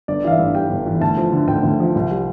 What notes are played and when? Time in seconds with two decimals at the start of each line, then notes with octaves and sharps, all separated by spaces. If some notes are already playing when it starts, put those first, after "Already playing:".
0.08 G1 D5
0.24 E3 F5
0.31 E5
0.39 G2
0.55 G3 G5
0.70 G1
0.87 E3
1.01 D2 A5
1.17 F3
1.32 D3
1.48 D2 G5
1.63 D2
1.80 F3
1.95 C2
2.11 G3